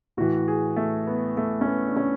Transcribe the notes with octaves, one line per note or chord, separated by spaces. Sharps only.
A2 E3 F#4
G#4
A3
B3
A3
C#4
B3
D4
C#4